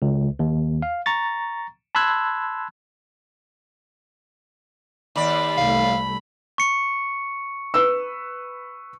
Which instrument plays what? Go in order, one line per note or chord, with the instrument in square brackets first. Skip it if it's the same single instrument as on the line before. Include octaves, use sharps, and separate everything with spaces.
[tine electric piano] C#2
D#2
F5
A#5 C#6 A6
A5 B5 C6 E6 F#6 G#6
[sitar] D#2 D5 [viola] B5
[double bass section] C2 G3 A3 [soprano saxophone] F5
[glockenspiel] C#6 C#7
[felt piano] B4 E6